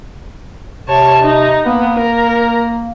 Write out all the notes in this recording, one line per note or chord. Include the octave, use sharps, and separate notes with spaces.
C3 C#5 A5
D#4
A#3 B3
A#4